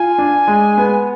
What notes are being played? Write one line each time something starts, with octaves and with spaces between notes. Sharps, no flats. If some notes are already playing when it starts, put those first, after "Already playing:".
Already playing: F4 G#5
D4
G#3
B3